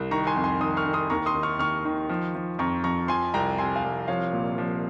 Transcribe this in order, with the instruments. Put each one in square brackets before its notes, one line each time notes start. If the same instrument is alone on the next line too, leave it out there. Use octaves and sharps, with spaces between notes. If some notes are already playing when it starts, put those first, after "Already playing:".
Already playing: [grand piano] C2
D#3 A#5 C#6
G#5 C6
F2
G#5 C6
D#3 C6 D#6
C#6 F6
D#3
C6 D#6
D#2 A#5 C#6
C6 D#6
D#3
C#6 F6
D#2 C#6 F6
D#3
F3
F3
F2 A#5 C#6
F2 A#5 C#6
F3 G#5 C6
C2 G5 A#5
C3 G#5 C6
F5 G#5
C2
F3 C#5 F5
A#2
F3